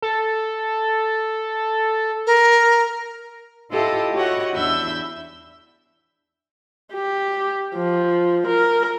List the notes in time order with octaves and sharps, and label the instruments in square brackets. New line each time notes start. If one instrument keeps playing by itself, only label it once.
[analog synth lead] A4
[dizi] A#4
[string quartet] E4 F4 G4 A4 D#5 E5
E4 F#4 G4 C#5 D#5 F#5
E2 D4 E4 E5 E6 G6
[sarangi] G4
F3
A#4